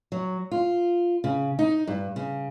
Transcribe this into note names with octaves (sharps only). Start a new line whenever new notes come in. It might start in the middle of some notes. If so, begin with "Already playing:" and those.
F#3
F4
C#3
D#4
G2
C#3